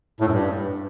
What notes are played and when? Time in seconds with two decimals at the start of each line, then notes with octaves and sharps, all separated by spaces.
0.20 A2
0.26 F#2
0.32 G2